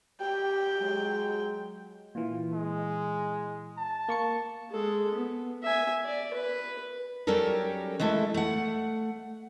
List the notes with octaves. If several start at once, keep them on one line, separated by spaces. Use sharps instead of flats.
G4 G5
F#3 G#3
A#2 E3 F4
G#3
A5
A#3 C#6 C#7
G#3 A4
B3
E5 G#5
D5
B4
F#3 G3 C#4 G4 A4 A#4
G#3 A3 E4 A4
A3 F#5